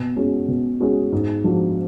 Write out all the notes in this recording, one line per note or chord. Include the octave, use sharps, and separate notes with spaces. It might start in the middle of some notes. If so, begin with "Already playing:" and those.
Already playing: B2
G#3 C#4 F#4
B2
G#3 C#4 F#4
G#2
F3 G#3 D4 F#4